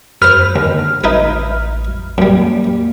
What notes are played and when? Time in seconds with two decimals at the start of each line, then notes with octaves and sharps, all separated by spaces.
0.22 F#2 B4 C5 F6
0.56 D#2 D3
1.04 A1 D#4 E4 B4
2.18 F#2 G3 A#3